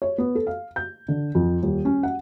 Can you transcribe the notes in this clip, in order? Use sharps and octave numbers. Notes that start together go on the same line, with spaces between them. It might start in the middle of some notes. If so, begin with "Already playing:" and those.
C#5
B3
A4
F5
G6
D3
F2
D#1
C#4
F#5